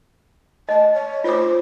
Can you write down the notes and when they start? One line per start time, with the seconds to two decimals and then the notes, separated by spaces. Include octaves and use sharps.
0.69 D#5 A5
0.94 C#5
1.24 F4 C5 D6